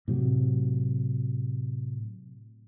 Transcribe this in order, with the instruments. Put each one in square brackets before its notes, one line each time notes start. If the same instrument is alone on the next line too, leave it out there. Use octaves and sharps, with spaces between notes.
[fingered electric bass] A2 C3 F#3